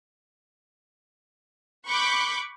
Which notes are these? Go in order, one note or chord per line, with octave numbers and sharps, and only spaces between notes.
B5 C#6 D6 F#6 G6